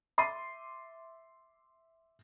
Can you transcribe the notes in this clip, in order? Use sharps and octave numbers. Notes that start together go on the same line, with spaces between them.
E5 C6 D6 A6 C7 D#7